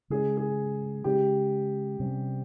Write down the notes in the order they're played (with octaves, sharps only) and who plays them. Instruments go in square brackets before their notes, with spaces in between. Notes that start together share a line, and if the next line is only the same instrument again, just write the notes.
[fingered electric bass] C#3 G#3 C#4 [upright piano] G#4
[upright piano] G#4
[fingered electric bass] C#3 G#3 C#4 [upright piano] G4
[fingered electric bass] C3 G3 C#4